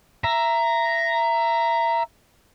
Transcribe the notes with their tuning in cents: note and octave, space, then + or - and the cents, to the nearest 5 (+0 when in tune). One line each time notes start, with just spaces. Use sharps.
E5 +20 A#5 +0